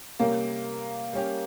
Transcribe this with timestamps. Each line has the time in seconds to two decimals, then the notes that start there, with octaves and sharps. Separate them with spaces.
0.19 C3 G3 A#3 C#4 G4
1.13 G3 C#4 G4